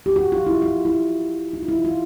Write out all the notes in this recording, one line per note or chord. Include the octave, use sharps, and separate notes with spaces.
G4
F#4
F4
E4
F4
E4
D#4
F4
E4
F4